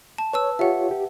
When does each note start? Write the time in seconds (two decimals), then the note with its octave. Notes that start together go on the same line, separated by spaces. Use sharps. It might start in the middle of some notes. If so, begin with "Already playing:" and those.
0.18 A5
0.33 B4 C#5 A5 E6
0.59 F4 G4 C#5 E5 F#5
0.91 G4